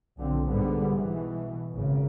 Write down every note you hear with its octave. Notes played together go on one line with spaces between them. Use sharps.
B1 D3 F3 C4
G#2 D3 G3 B3
B2 E3
G#1 C#3